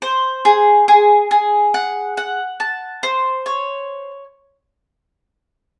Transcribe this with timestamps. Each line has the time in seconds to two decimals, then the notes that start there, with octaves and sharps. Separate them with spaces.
0.02 C5
0.45 G#4
0.88 G#4
1.31 G#4
1.74 F#5
2.17 F#5
2.60 A5
3.03 C5
3.46 C#5